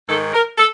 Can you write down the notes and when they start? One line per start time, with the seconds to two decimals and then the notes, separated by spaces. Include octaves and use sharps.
0.09 G#2 D#3 A4
0.33 A#4
0.58 A4